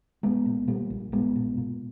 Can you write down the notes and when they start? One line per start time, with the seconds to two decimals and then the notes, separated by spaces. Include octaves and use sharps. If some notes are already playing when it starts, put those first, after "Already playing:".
0.23 A#1 G#3 B3
0.46 A#2
0.68 A#2 G3 A#3
0.90 A#1
1.12 A#1 G#3 B3
1.36 A#2
1.57 A#2